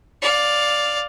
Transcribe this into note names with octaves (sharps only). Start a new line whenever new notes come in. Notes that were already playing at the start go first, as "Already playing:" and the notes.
D5 F5